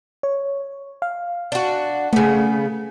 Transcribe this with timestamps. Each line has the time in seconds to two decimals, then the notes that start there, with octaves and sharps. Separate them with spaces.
0.23 C#5
1.02 F5
1.52 D4 F#4
2.13 C#3 A3 B3